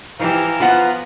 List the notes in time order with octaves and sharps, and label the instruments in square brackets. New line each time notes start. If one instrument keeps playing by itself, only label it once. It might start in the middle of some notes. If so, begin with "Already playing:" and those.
[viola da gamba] E3 [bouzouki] F3 E4 G4 [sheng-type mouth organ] F5 A#5
[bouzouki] F3 B3 [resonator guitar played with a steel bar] F4 B4 F#5